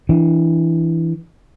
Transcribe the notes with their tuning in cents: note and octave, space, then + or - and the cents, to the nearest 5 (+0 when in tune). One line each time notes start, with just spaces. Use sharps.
E3 +0 D4 +0